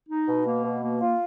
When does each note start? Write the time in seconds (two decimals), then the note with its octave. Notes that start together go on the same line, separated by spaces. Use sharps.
0.09 D#4
0.28 B2
0.46 A#3
0.64 B2
0.83 A#3
1.01 F4